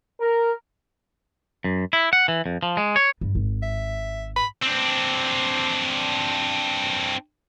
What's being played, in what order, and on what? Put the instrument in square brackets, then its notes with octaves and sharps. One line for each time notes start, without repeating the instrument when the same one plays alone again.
[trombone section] A#4
[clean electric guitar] F#2
E4
F#5
E3
F2
F3
G#3
C#5
[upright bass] G2
G#1
[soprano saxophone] E5
B5
[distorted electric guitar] C4 D4